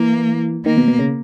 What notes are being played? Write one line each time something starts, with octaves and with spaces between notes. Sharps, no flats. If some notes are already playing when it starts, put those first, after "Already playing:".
Already playing: E3 A#3
D#3 A#3
B2
B2
C#3